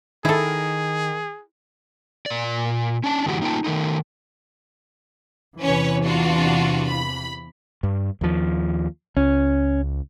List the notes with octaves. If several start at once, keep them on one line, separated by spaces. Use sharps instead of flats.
D#3 E4 G#4 A4
A#2 D5
C#4 D4 A5
F#2 D3 E3 G#3 F#4 G4
A#3 D#4 F4 G#4 G5 A5
D#3 A3 D#4
E2 C3 E3 C#4 B4 C#5
D4 F4 F#4
B5
G2
D#2 F3
C#2 C#4